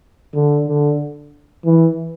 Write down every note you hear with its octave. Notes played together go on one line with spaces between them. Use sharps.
D3
D3
E3